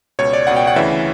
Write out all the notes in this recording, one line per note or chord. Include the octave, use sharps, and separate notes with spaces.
C#2 B2 C#5
D5
C#2 B2 F#5
G5
F#5
D2 C#3 E3 E5